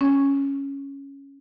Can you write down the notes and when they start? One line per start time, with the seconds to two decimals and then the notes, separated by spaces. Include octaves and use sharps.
0.01 C#4